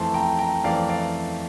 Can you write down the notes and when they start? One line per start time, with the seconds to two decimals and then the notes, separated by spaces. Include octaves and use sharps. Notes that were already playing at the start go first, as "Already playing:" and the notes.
Already playing: F2 E3 A3 A5 C6
0.14 G5 A#5
0.39 G5 A#5
0.64 F2 E3 A3 D5 F5
0.89 D5 F5